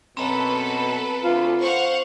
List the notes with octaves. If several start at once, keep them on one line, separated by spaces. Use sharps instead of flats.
F#2 B2 C4 A4 B4 A#5 B5
D2 F4
C5 F5 F#5 C#6